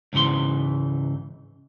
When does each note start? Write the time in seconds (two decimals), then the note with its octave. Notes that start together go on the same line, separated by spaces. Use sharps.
0.13 C#2 G#2 C#3 E3 C6